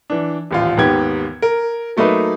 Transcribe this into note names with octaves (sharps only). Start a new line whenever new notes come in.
E3 D4
D#1 A1 F4
D#2 G#2 B3 G4 G#6
A#4
F#3 A3 A#3 D#4 B4